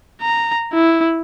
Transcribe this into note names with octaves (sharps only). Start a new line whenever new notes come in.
A#5
E4